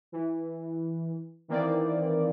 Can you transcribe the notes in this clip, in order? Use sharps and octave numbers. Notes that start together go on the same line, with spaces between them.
E3
D#3 E3 A#3 C4 D5